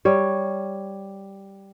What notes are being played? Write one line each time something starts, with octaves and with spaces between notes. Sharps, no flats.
G3 C#5